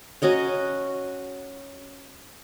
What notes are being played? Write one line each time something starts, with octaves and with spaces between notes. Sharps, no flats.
C#4 F#4 D#5 A#5